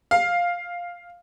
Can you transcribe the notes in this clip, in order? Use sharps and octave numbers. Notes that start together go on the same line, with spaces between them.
F5